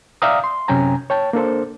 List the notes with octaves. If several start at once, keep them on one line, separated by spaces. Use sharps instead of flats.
D5 E5 F5 G5 A#5 D#6
C6
F#2 C3 C#4 G5 G#5 A#5
C#5 G5 A5
A#3 D4 A4 C5